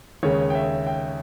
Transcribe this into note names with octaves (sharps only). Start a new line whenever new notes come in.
D#2 C#3 G#3 C#5
G5
E5
G5